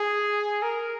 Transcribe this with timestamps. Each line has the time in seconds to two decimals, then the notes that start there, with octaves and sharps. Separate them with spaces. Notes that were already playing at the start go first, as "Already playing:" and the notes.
Already playing: G#4
0.62 A#4